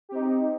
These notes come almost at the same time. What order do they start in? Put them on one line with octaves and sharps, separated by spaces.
G4 C4 D#4